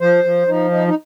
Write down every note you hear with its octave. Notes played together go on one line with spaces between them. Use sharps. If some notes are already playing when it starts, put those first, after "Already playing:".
F3 C5
F3
F3 D#4
D#4
D#4